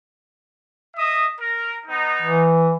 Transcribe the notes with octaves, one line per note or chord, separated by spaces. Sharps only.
D#5 E5 D#6
A#4
B3 D#4
E3